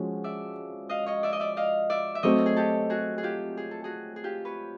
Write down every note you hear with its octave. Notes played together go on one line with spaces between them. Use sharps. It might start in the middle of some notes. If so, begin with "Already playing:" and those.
Already playing: F3 G#3 C#4 F#4
D5 E5
D#5 F5
C#5 D#5
D5 E5
D#5
D5 E5
D#5 F5
D5 E5
E5
F#3 A3 C4 C#5 D#5
G#4
G4 A4
F#4 G#4
G#4
F4 G4
G#4
A4
F#4 G#4
G#4
F4 G4
B4 C#5